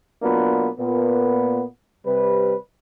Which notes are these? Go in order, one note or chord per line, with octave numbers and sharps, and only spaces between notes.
B2 F#3 A#3 B3 D4 F4
A#2 B3
C3 G3 B4